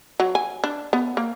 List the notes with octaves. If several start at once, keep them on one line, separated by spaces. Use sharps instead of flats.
F#3
G#5
D4
B3
A#3